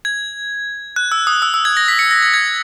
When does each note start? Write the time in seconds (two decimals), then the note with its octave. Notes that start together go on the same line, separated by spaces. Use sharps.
0.05 G#6
0.96 F#6
1.12 E6
1.27 D#6
1.42 E6
1.54 E6
1.65 G#6
1.77 A#6
1.88 B6
1.99 C#7
2.11 A#6
2.22 G#6
2.34 G#6